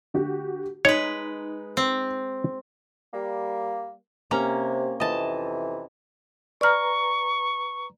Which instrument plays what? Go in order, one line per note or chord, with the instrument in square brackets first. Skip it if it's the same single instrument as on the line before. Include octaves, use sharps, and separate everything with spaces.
[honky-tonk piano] D3 F#4 G4
[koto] G#3 B4 [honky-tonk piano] D#4 [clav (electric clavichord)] C#5
[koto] C4
[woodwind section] G3 A#3
[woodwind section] C3 [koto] A#3 C#4 A#5
[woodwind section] F2 C3 E3 [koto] D#5 A5
[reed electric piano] B4 A#5 [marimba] D5 F6 [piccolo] C#6